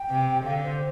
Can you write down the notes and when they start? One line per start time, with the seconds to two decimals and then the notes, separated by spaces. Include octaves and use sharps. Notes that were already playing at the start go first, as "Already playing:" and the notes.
Already playing: G5
0.10 C3
0.45 D3 F5
0.63 C5